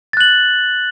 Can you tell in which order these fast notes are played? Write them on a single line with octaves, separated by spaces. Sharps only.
A6 F#6 F#7